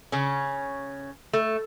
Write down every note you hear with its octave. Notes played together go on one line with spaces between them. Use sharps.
C#3 C#4
A3